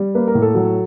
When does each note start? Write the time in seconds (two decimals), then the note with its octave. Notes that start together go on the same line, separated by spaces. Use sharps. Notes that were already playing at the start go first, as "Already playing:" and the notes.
Already playing: G3
0.15 A#3 B4
0.27 A#4
0.35 A2
0.42 A4
0.55 F#3